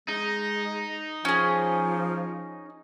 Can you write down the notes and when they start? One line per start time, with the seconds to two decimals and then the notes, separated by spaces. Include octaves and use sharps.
0.08 G#3 D#4
1.25 F3 C#4 G#4